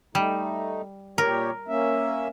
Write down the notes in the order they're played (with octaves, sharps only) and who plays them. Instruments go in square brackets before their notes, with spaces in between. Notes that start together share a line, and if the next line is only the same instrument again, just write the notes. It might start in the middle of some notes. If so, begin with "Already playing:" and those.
[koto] G3 [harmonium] A3 D#4
[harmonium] A#2 G4 C#5 [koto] A#4
[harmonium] A#3 C#4 E5